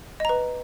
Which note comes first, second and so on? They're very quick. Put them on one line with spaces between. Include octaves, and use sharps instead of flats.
D#5 A#5 B4